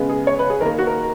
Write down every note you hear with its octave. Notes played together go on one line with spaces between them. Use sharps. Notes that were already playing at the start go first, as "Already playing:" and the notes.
Already playing: C#3 G#3 B3
G#4
C#5
B4
G#4
D#3 A#3 A#4
F#4
A#4